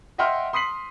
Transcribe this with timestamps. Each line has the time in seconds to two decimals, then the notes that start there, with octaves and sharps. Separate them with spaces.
0.18 D#5 E5 F#5 G5 C6 F6
0.53 C6 D#6 B6 C7 F#7